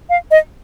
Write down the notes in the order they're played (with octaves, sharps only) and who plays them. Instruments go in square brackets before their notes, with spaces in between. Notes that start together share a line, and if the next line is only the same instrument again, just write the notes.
[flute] F5
D#5